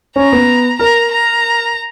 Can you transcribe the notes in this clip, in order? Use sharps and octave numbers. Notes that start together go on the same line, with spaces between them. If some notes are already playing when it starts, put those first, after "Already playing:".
C#4 A#5
B3
A#4 A#5
A#5